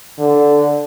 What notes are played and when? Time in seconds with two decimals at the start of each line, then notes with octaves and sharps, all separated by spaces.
0.19 D3